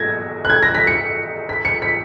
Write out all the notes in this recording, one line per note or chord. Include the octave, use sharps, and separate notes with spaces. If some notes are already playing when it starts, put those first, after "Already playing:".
Already playing: G#6 A#6
F#6
G#6
A#6
B6
C#7
B6
C#7
B6